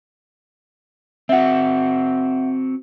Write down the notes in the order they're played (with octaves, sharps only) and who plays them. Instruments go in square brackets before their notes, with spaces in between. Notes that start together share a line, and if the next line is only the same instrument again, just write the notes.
[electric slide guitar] C4 F#4 [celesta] E5 F#5